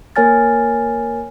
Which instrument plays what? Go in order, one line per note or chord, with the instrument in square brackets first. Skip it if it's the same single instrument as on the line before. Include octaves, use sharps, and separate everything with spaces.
[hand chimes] A#3 A#4 C#5 G#5 F6 A6